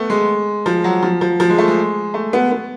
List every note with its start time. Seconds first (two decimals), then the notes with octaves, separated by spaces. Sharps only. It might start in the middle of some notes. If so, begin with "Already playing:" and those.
Already playing: A3 B3
0.10 G#3
0.66 F3
0.84 F#3
1.03 F3
1.21 F3
1.40 F3
1.49 G#3
1.58 A3
1.68 G#3
2.14 A3
2.33 B3
2.51 B3